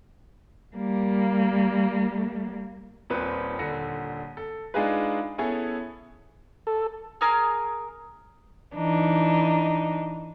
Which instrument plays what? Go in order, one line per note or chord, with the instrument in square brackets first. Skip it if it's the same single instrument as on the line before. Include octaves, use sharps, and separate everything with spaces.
[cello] G3 A#3
[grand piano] D#1 A#2 C4 B4
D#1 D3 A#6 C#7
A4
G#3 D4 D#4 F4 G#4 B4
B3 C#4 E4 G#4 A4 C#5
[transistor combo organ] A4
[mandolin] G#4 A#4 D#6 F6
[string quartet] E3 D4 D#4